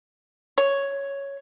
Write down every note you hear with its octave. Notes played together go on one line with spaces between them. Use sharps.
C#5